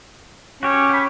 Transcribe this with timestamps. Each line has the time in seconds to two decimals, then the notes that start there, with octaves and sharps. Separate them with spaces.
0.63 C#4 F#4 G4 C#5
0.89 G4 B5